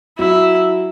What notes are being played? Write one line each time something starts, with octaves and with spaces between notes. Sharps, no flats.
F#3 E4